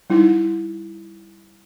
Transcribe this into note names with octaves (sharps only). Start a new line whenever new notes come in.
G3 D#4 E4